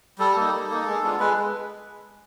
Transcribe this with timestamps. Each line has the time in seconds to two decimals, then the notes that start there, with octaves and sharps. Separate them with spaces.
0.19 G3 A4
0.36 A#3 D#4
0.53 G3
0.69 A#3 D#4
0.86 G#3
1.03 B3 D4 F4
1.20 G#3 B4